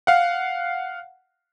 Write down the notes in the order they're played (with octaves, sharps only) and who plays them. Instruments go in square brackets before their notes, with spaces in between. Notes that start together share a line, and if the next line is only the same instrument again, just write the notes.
[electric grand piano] F5 F#5